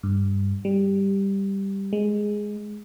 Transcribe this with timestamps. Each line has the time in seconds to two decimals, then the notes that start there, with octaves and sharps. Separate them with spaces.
0.03 G2
0.65 G3
1.93 G#3